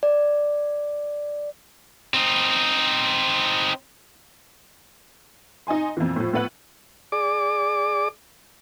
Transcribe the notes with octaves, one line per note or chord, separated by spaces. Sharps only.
D5
C4 D#4
D#4 D#5 G#5 C6
F2 A#2 E3
A2 F3
A2 F3 B3 B4 F#5 F#7
G#4 D5 D6